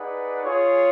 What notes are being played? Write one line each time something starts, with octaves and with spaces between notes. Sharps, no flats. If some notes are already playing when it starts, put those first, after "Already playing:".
Already playing: D#4 G#4 B4 D5 F#5
F4 G#4 C#5